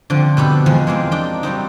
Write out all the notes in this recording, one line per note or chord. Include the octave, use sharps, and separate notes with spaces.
D3 F3 C4
B2 B3 G4 A4
E2 F3 G#3
G#3 A#3 C4 F4
D4 D#4 G5
F#3 G3 C4 D#4